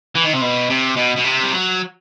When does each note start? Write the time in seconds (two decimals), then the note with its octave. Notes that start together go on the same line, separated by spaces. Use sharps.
0.15 E3
0.23 D#3
0.33 C3
0.41 B2
0.70 C3
0.96 B2
1.16 B2
1.24 C3
1.43 G3
1.51 F#3